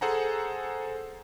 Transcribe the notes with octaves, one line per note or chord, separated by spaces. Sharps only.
G#4 A4 C5 F#5 G#5 A#5